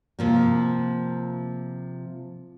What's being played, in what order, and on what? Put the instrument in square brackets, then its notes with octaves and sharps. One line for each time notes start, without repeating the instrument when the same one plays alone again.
[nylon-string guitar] C3 F3 A#3